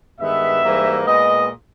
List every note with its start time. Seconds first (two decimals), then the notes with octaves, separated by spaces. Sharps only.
0.20 G2 D#3 G#3 B3 E5
0.63 G#2 E3 G3 A#3
1.06 A#2 G#3 B3 D#5